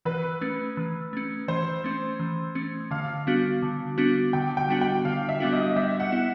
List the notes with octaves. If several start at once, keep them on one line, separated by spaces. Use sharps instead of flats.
E3 B4
A3 C#4
E3
A3 C#4
E3 C5
A3 C#4
E3
A3 C#4
D3 F5
G3 B3 D4 F#4
D3
G3 B3 D4 F#4
D3 G5
G5
G3 B3 D4 F#4
G5
D3 F5
E5
G3 B3 D4 F#4
D#5
G3 E5
F#5
B3 E4